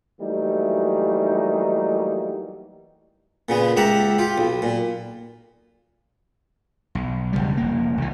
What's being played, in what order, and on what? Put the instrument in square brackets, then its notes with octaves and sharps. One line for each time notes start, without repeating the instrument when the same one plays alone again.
[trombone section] E3 F#3 G3 A3 A#3 D#4
[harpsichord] A#2 C#3 B3
C#2 G4 E5 F#5 A5 A#5
F4 G4
B1
A#2
[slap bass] B1
E1 C2 C#3 G3
F1 A#3
C2 E3